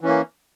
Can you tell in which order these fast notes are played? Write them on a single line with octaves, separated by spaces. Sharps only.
E3 C#4 A#3